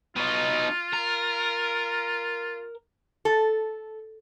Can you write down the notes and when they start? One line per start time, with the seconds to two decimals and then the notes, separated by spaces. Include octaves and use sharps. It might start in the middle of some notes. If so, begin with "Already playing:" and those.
0.16 B2 D#4 F4
0.93 A#4
3.25 A4